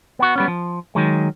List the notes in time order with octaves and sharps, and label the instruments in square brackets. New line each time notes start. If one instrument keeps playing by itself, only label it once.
[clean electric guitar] B3 F#4
G3 B3 C#4
F3
D#3 F#3 G#3